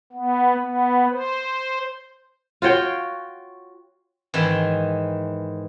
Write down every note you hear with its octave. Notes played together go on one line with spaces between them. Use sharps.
B3
B3
C5
F4 F#4 C#5 G5
G#2 D#3 E3